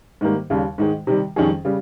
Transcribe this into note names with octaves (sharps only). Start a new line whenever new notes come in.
G#2 D#3 G3 A#3
D#2 C#3 G3
G#2 D#3 G#3
C3 D#3 G3
F2 D#3 G3 C#4 G#4
C#3 G3